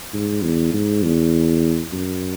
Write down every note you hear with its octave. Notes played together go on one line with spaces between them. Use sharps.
G#2
E2
G#2
E2
F#2